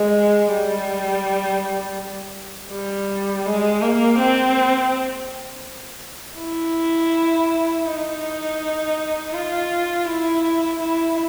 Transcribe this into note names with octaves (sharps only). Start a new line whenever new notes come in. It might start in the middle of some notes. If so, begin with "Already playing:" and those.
Already playing: G#3
G3
G3
G#3
A#3
C4
E4
D#4
F4
E4
E4